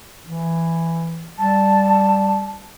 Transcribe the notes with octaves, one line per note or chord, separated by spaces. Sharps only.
E3
G3 A5